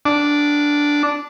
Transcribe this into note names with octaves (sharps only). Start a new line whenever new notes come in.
D4